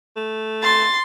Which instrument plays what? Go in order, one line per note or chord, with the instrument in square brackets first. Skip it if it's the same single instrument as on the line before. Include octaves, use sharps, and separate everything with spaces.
[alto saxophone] A3
[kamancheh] C6 [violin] A6